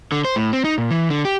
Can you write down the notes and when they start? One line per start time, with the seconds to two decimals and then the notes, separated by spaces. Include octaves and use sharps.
0.12 D3
0.25 C5
0.36 A2
0.53 C4
0.65 D#4
0.78 A#2
0.91 E3
1.10 D3
1.25 G4